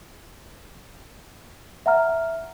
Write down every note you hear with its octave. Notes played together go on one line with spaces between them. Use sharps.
E5 F#5 A#5 F6